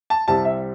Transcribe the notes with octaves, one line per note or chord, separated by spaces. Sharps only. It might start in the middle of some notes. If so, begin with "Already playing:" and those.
A5
C2 C3 G3 C4 A5
E5